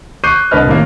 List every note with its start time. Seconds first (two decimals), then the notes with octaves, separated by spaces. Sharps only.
0.24 C#6 D6 F#6 G6 C7 D#7
0.51 C2 D4 B4 D#5 F6
0.66 A2 C3 D#3 A#3